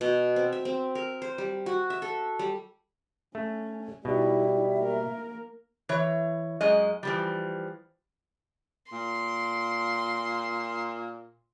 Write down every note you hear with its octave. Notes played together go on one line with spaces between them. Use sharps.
B2
C4
E5
C4
A#4
C5
G3
F#4
E5
A4
G3
A3 C#4
B2 G3 D#4 E4 E5
A#3 A#4
E3 C#5
F#2 G#3 D#5
E3 F3 G3
A#2 C6